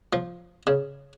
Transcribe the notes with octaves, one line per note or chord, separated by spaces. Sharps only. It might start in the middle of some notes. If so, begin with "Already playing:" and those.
F3
C#3